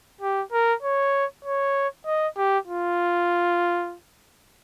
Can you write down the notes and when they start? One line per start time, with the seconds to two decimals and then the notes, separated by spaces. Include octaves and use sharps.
0.21 G4
0.52 A#4
0.82 C#5
1.45 C#5
2.06 D#5
2.37 G4
2.67 F4